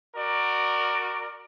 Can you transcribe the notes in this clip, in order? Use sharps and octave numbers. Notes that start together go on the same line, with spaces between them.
F#4 A#4 D5